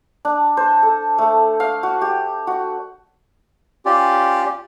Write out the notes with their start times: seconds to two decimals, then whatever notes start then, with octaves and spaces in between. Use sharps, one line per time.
0.25 D4
0.57 C5
0.83 A4
1.18 A3
1.60 F5
1.83 F#4
2.01 G4
2.47 F#4
3.86 C#4 F4 G4 D5